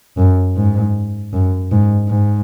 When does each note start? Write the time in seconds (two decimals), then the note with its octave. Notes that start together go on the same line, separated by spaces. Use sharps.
0.17 F#2
0.56 G#2
1.33 F#2
1.72 G#2
2.09 G#2